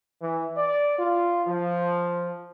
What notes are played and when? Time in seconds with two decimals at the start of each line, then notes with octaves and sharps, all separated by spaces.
0.22 E3
0.57 D5
0.99 F4
1.47 F3